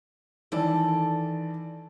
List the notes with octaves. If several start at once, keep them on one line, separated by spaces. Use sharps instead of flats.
D#3 E3 A4 D5